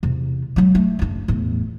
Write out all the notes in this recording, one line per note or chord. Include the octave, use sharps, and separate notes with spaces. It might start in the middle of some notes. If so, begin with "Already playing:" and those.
E2 C3
F#3 G#3
A3
F#1 D4
E2 A2